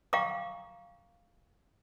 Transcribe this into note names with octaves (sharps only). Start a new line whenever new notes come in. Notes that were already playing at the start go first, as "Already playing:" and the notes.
F5 G5 A#5 C#6 D6